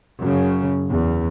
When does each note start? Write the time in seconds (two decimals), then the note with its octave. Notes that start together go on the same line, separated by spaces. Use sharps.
0.20 F#2 C#3
0.90 E2